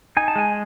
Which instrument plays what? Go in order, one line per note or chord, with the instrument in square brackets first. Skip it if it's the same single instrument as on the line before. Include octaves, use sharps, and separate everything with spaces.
[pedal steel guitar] D#4 G#5
A5
G#3 G#5